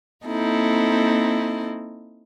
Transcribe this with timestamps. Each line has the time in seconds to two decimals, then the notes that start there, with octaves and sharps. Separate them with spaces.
0.24 A#3 C4 D#4 E4 A4